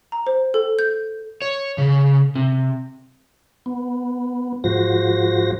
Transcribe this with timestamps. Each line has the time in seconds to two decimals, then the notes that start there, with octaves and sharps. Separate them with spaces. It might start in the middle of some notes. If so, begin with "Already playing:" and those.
0.12 A#5
0.27 C5
0.54 A4
0.79 G6
1.42 C#5
1.78 C#3
2.35 C3
3.66 B3
4.64 G#2 F3 F#4 C5 A#6